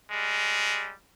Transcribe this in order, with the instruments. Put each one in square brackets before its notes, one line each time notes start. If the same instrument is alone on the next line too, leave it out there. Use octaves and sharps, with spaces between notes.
[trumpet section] G3 G#3